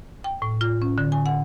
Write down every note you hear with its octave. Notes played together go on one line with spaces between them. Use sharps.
G5
A2
F4
C#4
D3
G#5
F#5